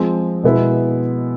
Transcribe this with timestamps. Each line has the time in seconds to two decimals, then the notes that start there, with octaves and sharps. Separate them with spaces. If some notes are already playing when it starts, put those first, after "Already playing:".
Already playing: F3 G#3 C4
0.44 B2 G#3 B3 E4